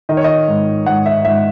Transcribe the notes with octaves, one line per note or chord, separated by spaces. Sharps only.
D#3 D#5
C#5
D#5
G#2
G#2 F#5
E5
G#2 E5